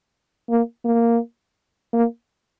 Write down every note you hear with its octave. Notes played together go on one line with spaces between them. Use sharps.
A#3
A#3
A#3